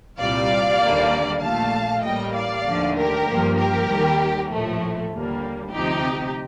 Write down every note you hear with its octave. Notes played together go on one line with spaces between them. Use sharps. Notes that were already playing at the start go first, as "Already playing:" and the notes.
C2 A#2 G3 D5 F5
D#2 D3 G3 A#3
A#1 A#2 A3 F5 A5
A1 A2 G3 A#3 D#5 G5
D5 F5
D#2 D3 F3 A3
G4 A#4
G2 F3 A#3
G4 A#4
D#2 D#3 G3
A#1 A2 F3 A3
D#2 D3 G3 A#3
D2 C3 F3 D#4 G4